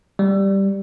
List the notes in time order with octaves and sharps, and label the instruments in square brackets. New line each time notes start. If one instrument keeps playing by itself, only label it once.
[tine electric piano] G3